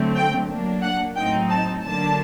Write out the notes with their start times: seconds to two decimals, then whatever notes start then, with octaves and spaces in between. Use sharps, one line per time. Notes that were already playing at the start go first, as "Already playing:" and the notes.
Already playing: D3 F#3 A3 C4
0.16 G5
0.49 F#3 A#3 D4
0.83 F#5
1.16 A2 F#3 C4 D#4 G5
1.50 A5
1.84 D3 F#3 A#3 D4 A5